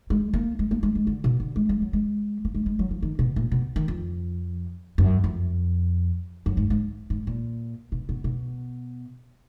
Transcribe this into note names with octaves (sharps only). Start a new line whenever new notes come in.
G#3
A#3
G#3
A#3
G#3
G#3
D3
B2
D3
G#3
G#3
F#3
G#3
A#3
G#3
G#3
F#3
F3
D#3
B2
A#2
B2
D#3
F2
F#2
F2
F#2
G#2
G#2
G#2
A#2
B2
B2
B2